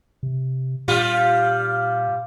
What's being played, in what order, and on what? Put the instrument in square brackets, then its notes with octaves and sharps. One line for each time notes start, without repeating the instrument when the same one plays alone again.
[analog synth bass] C3
[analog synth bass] A#2 [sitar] G3 F4